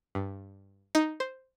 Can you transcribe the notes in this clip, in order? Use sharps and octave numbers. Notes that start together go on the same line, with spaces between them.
G2
D#4
C5